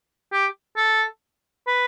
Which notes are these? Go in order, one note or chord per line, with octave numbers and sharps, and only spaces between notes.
G4
A4
B4